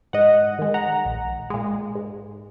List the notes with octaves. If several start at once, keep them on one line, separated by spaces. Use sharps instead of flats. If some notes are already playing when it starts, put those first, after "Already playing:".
G#2 D#5 F#5
D#3 G#3
F#5 A#5
A#1
A#2 G#3
G#2